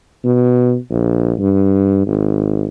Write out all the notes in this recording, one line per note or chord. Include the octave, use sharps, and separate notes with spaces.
B2
A#1
G2
G#1